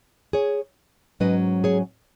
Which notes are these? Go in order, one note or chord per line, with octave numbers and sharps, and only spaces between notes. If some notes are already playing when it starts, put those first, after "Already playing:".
G#4 C#5
G#2 F#3 C#4 B4 D#5
G#4 C#5